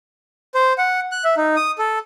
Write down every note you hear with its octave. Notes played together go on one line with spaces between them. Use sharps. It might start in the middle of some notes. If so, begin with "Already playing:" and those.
C5
F#5
F#6
E5
D#4
D#6
A4